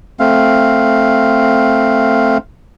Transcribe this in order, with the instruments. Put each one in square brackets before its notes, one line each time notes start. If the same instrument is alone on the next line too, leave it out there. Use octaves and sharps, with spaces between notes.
[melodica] A3 C4 F5